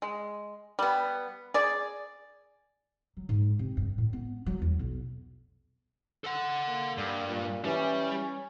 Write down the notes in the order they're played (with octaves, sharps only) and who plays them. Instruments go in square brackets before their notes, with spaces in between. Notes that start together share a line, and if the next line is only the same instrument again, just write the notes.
[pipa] G#3
G3 B3
G#4 D5
[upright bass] F#3
G#2
C3
G2
A2
B3
F#3
E2
B1
[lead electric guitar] A4 F#5
[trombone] A#3
[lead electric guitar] G2
[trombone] A#2
[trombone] E3 [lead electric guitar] G3 [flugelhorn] C#4